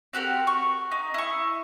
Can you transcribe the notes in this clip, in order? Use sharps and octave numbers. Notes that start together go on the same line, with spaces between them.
C4 F#4 G4 A#4
C#6
D#4
E4 C#6